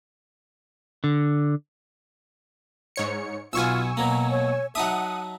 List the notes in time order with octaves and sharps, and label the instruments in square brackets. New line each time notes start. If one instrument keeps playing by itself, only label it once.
[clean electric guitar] D3
[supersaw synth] G#2 C#5 C#7
[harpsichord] B1 B3 [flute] F4 [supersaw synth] G#5 C#6 E6
[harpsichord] B2 F#3 A#3 [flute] A#5
[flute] C#5
[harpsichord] F#3 D#4 E5 [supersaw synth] F#5 D#6 [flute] A5